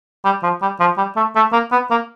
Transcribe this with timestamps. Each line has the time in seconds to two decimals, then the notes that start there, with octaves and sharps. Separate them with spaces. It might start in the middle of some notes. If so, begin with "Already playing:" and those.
0.25 G3
0.43 F3
0.62 G3
0.80 F3
0.98 G3
1.16 A3
1.35 A3
1.53 A#3
1.72 B3
1.91 A#3